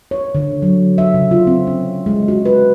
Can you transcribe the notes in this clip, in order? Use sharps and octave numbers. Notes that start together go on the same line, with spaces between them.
C#5
D3
F#3
E5
C#3
F4
C4
C#4
G#3
F#4
B4